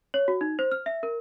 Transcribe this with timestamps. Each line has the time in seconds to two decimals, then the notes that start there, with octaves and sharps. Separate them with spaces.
0.14 C#5
0.28 F#4
0.41 D#4
0.59 C5
0.71 F6
0.86 E5
1.03 A#4